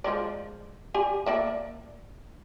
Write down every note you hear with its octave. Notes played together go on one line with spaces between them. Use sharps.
F3 G#3 D5
G4 D5 G#5
A#3 D5 E5